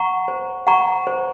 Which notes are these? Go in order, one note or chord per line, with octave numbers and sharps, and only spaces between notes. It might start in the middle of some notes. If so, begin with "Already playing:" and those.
Already playing: F#5 A#5 C#6
C5
F#5 A#5 C#6
C5